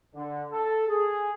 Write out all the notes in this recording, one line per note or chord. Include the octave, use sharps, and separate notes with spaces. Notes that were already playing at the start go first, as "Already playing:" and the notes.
D3
A4
G#4